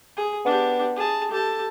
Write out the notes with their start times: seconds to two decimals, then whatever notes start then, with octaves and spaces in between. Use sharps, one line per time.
0.17 G#4
0.46 B3 D4 G4
0.96 G#4 A5
1.31 G4 A4 A5